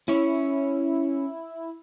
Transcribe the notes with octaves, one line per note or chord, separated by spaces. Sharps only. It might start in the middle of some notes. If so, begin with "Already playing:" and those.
C#4 E4 C#5